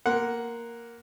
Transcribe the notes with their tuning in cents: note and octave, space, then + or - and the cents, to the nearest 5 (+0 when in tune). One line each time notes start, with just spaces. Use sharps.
A#3 +0 F#5 +0 C6 -15